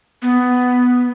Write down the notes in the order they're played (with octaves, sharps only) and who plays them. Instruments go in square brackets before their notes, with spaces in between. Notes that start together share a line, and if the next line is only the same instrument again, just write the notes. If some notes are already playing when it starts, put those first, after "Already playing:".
[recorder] B3